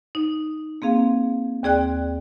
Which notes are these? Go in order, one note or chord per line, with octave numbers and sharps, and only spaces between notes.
D#4
A#3 C4 G#4 F5
D#2 C4 G#4 D5 G5 F#6